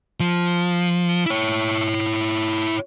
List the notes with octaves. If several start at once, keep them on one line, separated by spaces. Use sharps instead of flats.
F3
E4 C#5